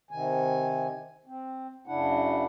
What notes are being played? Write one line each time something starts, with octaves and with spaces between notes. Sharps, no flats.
C3 D#3 G#5
C4
F#2 C#3 D4 E4 F#5